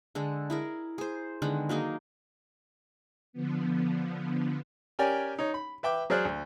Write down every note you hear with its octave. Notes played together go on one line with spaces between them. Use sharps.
D3 G#3 A4
E4 G#4 A#4
G#4 C5
D3 D#3 G#3 B3
F#3 A#3 D#4 G#4
D3 F3 B3
C#4 G4 A#4 D5 G5 G#5
D#4 C#5
B5
B4 E5 G5 D6
F#3 G#4 C5 D5 F6 F#6
D2